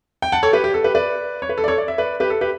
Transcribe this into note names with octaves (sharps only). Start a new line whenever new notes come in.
G5
F#5 A5
A4 C#5
G4 B4
G4
A4
G4 B4
B4 D5
C#5
B4
A4
D5
A4 C#5
D5
E5
B4 D5
G4 B4
A4
G4 B4